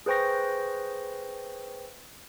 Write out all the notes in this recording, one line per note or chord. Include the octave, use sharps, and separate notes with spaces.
G#4 B4 C5 G5 C#6 A#6